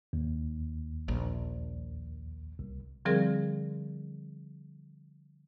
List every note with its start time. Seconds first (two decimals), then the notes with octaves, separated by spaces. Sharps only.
0.13 D#2
1.08 A#1
2.59 C2
3.05 D3 F3 G3 C4 G#4 A#4